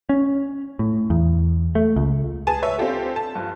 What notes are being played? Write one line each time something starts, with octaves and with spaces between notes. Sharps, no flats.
C#4
A2
E2
A3
C#2
G#4 B4 G#5 A5
B4 C#5 E5
C4 D4 F4 G4 A4
A5
G2 F3